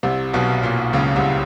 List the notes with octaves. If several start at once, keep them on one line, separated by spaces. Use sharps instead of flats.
C2 C3
B1 B2
A#2
C#2 C#3
C2 C3